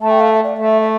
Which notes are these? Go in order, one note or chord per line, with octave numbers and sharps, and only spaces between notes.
A3 A5
G5
F5
E5
D5
A3 E5
E5